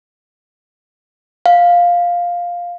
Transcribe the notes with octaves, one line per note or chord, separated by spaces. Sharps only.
F5